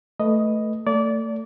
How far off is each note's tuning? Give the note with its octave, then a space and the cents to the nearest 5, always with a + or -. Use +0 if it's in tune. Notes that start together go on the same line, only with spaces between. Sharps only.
A3 +0 B4 +0 D#5 +0
A3 +30 D5 -25